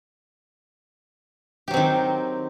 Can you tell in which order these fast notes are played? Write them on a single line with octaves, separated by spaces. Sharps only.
G4 F#3 C4 D#3